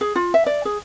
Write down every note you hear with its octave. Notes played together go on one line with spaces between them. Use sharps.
G#4
F4
E5
D5
G#4